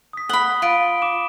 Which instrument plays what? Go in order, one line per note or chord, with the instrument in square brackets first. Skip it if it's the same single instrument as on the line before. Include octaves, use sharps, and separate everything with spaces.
[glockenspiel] D#6 B6
[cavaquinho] F#5 B5 [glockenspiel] D#6 G7
[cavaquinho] F4 [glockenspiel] B5 D7
[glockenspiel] D6 E7